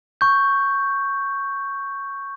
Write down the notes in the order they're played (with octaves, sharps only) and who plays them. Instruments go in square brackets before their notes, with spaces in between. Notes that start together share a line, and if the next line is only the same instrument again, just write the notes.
[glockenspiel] C#6 G6